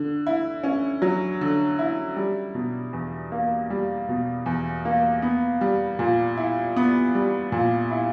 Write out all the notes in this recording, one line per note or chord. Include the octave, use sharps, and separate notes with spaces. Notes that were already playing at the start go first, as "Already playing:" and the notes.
Already playing: D3
E4
C#4
F#3
D3
E4
G3
B2
E2
A#3
G3
B2
E2
A#3
B3
G3
A#2
E4
B3
G3
A#2
E4